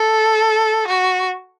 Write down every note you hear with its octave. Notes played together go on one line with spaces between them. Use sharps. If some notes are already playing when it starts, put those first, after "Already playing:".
Already playing: A4
F#4